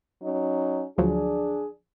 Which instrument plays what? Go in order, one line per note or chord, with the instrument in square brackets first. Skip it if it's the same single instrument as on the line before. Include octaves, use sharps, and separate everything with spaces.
[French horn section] F#3 C#4 D#4
[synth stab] D2 F3 F#3 [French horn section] D4 G#4